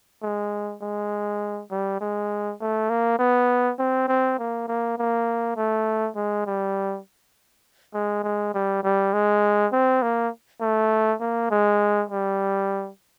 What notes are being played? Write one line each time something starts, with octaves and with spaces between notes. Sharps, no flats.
G#3
G#3
G3
G#3
A3
A#3
B3
C4
C4
A#3
A#3
A#3
A3
G#3
G3
G#3
G#3
G3
G3
G#3
C4
A#3
A3
A#3
G#3
G3